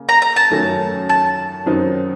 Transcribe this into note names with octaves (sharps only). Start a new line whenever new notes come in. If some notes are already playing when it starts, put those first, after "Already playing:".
Already playing: C#3 A#3
A#5
A#5
A5
F#2 D#3 F#3 A3 C#4
A5
F#2 D#3 F#3 C4 D#4